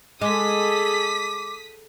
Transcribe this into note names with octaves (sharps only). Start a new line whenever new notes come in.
G#3 G#4 A4 D6 D#6 B6